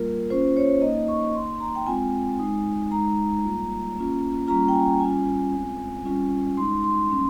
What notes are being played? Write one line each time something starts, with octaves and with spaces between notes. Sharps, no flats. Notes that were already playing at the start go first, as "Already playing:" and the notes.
Already playing: G3 A#3 F4 A#4
A#3 C#4 F4 C5
C#5
A#3 D#4 D#5
C#6
A#3 D#4 C6
A#5
G5
G#3 C4 F4 G#5
G#3 D#4
G#3 D#4 A#5
G3 A#3 F4
A#3 C#4 F4
G3 A#3 C#4 F4 A#5
G5
G#5
G3 C#4 F4 G#5
G#3 C4 F4
G3 C#4 F4
G#3 D#4 C6
C6
G3 A#3 C#4